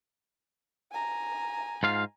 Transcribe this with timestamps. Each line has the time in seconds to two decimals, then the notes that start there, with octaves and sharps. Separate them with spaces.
0.91 G#5 A#5
1.83 G#2 F4 F5